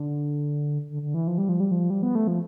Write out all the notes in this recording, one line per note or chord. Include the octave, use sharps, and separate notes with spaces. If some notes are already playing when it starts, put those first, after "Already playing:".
Already playing: D3
D3
D3
E3
F3
G3
F3
G3
F3
G3
B3
A3
F3